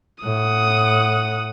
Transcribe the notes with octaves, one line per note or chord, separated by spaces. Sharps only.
A2 F#5 D#6